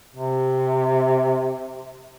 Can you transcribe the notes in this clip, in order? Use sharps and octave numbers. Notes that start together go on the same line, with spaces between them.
C3